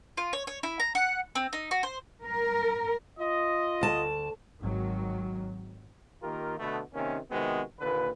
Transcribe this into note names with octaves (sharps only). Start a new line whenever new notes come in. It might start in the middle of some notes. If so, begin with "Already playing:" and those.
F4
C#5
C#5
E4
A#5
F#5
C4
D#4
F#4
C5
A#4
F4 D#5
D2 A5
G#1 D#3 F#3
D#3 A#3 F4 G4 A#4
B2 D3 A3 B3
C3 D#3 A#3 C#4
C3 D#3 G#3 B3 C4 F#4
D#2 A#2 D3 B4